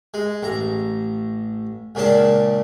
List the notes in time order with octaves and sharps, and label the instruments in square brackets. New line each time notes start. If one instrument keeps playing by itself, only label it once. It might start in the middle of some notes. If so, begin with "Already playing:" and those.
[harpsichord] G#3
A1 A#5
C#2 A#2 C#3 D4 A5